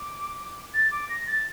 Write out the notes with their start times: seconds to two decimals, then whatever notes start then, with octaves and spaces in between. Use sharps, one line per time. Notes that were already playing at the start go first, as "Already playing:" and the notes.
Already playing: D6
0.74 A6
0.91 D6
1.09 A#6
1.27 A6